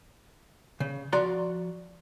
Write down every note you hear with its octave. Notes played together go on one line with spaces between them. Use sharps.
C#3
F3 F#4 D5 A#5 C6